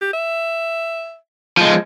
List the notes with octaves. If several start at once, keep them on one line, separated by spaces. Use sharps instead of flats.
G4
E5
F3 G#3 C5